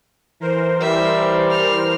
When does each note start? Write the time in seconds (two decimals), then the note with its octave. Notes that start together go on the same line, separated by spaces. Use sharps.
0.40 E3 A#4 C5
0.80 G3 E5
1.50 F6